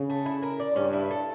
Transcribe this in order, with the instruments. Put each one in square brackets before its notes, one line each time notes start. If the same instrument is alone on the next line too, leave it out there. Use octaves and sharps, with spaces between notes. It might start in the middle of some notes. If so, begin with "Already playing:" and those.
Already playing: [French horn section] C#3
[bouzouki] A3
E4
A#4
D5
[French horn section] G2 [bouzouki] C#4
[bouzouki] E4
A4